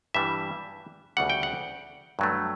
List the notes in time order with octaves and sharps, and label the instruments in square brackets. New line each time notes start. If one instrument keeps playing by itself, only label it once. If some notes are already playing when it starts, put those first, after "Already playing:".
[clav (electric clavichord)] G2 E3 G3 E5
D2 C#3 G3 F#5
G5
F#5
G2 F#3 A3